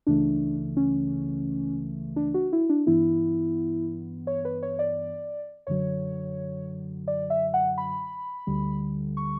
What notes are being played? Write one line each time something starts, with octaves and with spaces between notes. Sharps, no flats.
C#2 C#3 E3 A3 D4
C#4
D4
F#4
E4
D4
G2 E3 B3 E4
C#5
B4
C#5
D5
F#2 D3 F#3 C#5
D5
E5
F#5
B5
D2 D3 G3
C#6